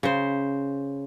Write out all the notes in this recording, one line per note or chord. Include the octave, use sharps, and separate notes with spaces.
C#3 C5